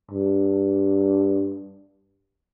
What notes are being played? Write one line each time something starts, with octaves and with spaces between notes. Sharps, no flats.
G2